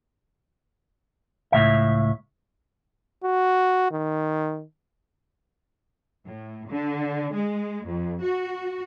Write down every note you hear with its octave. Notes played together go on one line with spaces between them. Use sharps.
C#2 A2 C3 E5
F#4
D#3
A2
D3
G#3
F2
F#4